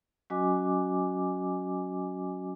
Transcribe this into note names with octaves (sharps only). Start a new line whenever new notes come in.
F#3 C#4 F#4 D#5 G#5 D6